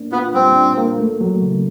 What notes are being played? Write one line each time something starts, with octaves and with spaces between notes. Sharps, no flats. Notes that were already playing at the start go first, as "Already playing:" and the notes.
Already playing: A#3 D4
B3 F4
G3 C4
D4
A#3
A3
F#3
C#3